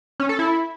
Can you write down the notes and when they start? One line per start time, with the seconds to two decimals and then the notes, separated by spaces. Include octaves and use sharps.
0.20 C#4
0.29 A4
0.39 E4